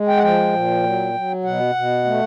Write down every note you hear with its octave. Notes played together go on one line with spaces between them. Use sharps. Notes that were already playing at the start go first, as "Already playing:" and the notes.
Already playing: G#3
G5
F#5
F3 G5
A#2
F#3
F#3
B2 F#5
B2
A3